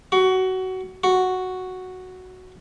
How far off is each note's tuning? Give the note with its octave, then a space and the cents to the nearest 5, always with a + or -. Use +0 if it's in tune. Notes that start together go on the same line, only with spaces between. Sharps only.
F#4 +20
F#4 +0